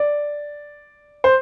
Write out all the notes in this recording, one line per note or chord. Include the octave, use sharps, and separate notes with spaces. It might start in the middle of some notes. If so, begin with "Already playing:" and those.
Already playing: D5
C5